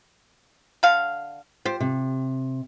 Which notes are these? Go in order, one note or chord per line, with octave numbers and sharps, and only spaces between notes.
D3 F5
F4 G4 C5
C3